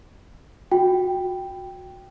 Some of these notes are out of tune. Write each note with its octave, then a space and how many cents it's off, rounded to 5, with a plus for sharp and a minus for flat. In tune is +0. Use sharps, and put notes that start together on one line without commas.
F#4 -25 G5 +0